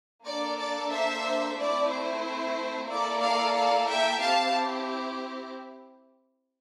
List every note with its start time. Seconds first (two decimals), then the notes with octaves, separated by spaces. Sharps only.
0.25 A#3 D4 A4 D5
0.58 D5
0.91 C5 E5
1.56 A3 C4 E4 D5
1.89 C5
2.87 A#3 E4 A4 D5
3.21 D5 F5
3.54 D5 F5
3.87 E5 G5
4.19 C4 E4 G4 F5 A5